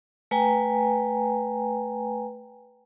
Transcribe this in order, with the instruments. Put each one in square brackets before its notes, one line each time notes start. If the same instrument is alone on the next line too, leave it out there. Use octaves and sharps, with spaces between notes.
[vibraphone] A3 B4 G5 G#5 A#5